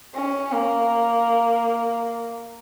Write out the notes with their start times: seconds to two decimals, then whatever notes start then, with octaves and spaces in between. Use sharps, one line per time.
0.15 C#4
0.52 A#3